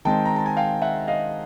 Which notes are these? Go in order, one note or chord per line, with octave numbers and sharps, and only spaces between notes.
D#3 G#3 C4 G5 A5
A#5
A5
G#5
F5 G5
E5 F#5
D#5 F5